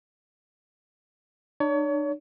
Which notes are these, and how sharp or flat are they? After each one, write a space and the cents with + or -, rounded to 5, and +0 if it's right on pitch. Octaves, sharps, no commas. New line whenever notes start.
D4 +40 C#5 +35